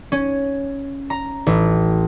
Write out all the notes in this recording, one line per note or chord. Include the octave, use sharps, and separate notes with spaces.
C#4
A#5
A1